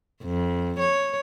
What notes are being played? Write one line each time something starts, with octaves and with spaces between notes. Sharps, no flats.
F2
C#5